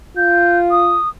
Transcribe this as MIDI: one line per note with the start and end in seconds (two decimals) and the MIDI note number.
0.17 0.99 65
0.17 0.58 91
0.71 1.09 87